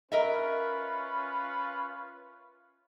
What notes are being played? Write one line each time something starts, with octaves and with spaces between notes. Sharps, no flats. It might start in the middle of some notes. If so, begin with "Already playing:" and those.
C#4 F4 A#4 B4 D#5 E5